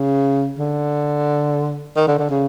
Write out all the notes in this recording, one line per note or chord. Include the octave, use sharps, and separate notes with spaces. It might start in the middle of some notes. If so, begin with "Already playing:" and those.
Already playing: C#3
D3
D#3
D3
D3
C#3